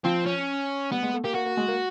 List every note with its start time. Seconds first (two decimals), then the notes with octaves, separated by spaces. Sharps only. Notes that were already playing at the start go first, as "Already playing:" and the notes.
0.04 F3 C4
0.26 C#4
0.92 G3 B3
1.03 G#3
1.13 A3
1.24 A#3 G4
1.35 A#3 F#4
1.46 A#3
1.57 G#3
1.68 A#3